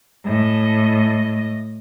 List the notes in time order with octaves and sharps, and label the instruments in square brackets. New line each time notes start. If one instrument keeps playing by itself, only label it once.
[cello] A2 D#5